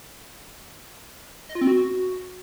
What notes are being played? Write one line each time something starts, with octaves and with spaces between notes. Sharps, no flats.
D#5
F4
C4
F#4